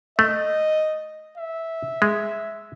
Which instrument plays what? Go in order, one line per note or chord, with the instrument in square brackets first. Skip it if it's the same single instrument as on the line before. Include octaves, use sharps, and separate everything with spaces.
[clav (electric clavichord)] A3 [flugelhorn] D#5
[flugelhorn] E5
[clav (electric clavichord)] G#3